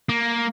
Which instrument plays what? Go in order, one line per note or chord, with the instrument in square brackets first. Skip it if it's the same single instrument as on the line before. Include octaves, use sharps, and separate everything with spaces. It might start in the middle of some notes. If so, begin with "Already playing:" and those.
[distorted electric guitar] A#3